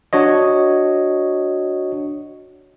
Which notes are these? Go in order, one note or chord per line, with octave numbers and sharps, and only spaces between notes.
D4 F#4 C#5 D#5